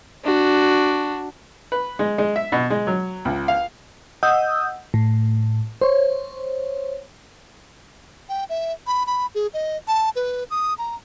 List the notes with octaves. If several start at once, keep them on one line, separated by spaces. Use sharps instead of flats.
D4 F#4
B4
G#3
G#3
E5
B2
G#3
F#3
C#2
F5
D#5 F#5 D#6 E6 G6
A2
C5 C#5
G5
E5
B5
B5
G#4
D#5
A5
B4
D#6
A#5